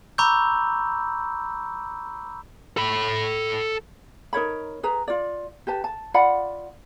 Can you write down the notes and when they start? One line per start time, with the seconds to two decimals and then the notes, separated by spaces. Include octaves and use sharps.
0.18 A#5 B5 C#6 D6 E6 G6
2.77 A4 B5
4.33 D#4 A#4 C#5 B5
4.83 G#4 B4 A#5
5.08 F4 D5
5.67 G4 B4 A5
5.84 A5
6.14 F4 D5 F#5 B5